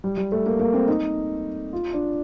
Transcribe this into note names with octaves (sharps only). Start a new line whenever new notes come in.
G3
G3
A3
A#3
A#3
C4
D#4
F4
D4